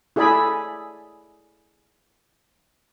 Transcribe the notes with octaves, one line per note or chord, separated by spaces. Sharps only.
E4 G#4 A4 D5 G#5 B5